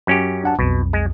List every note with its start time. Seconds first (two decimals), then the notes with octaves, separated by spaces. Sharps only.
0.07 F#2 C#4 G4
0.44 D4 F#5 A5
0.59 B1 F2 B2
0.93 G#3